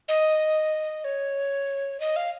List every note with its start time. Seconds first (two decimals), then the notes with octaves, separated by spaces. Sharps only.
0.08 D#5
1.04 C#5
2.00 D#5
2.16 F5